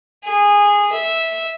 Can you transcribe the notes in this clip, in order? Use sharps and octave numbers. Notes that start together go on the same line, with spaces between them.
G#4
E5